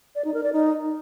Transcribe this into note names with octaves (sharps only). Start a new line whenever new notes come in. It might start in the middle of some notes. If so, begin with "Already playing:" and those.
D5
D#4
A#4
D5
D#4